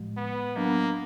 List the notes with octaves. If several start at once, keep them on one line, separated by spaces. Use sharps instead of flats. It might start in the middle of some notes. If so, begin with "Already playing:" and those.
Already playing: A2 F3 G#3
B3
F#3 A#3 B3 D4